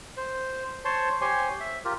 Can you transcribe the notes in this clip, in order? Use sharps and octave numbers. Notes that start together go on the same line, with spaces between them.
C5
C5 C#5 A5 C6
G4 C5 C#5 G#5 C6
E5
F4 G4 A#4